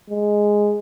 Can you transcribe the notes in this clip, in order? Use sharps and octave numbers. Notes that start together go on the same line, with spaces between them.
G#3